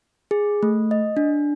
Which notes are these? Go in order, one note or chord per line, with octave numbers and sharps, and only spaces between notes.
G#4
A3
D#5
D4